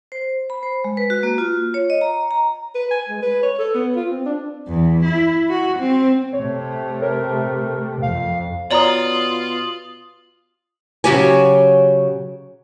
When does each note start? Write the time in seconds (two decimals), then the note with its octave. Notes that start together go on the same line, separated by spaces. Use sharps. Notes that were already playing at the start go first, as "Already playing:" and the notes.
0.12 C5
0.50 B5
0.63 C5
0.84 G#3
0.97 B4
1.10 F#4
1.23 A#3
1.38 F4
1.74 C#5
1.90 D#5
2.01 A#5
2.31 A#5
2.75 B4
2.91 G#5
3.09 G#3
3.23 B4
3.43 C#5
3.59 A4
3.75 B3
3.96 F4
4.11 C4
4.26 D4
4.67 E2
5.05 E4
5.49 F#4
5.79 C4
6.33 C3 A3 C#5
7.02 A#4
8.02 F2 F5
8.71 B2 F4 C#5 D5 A#5 D#6 F#7
11.04 C#3 F#3 F#4 G4 C#5 G#5